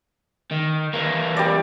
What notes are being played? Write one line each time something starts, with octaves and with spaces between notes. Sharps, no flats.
D#3
E3 A#3
G3 D5